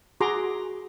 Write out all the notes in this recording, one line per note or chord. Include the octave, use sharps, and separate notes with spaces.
F#4 G#4 A#5 C6 D6